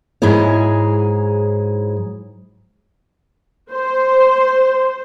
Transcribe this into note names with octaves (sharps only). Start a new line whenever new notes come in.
G#2 F#3 E4 G#4 C#5
C5